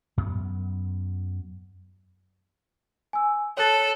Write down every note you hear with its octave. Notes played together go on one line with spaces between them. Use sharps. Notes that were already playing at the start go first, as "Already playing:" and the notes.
F#2 B3
G#5 E6
A4 C#5 F#6 A6